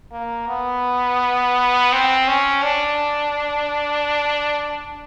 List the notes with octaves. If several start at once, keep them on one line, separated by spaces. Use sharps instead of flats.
A#3
B3
C4
C#4
D4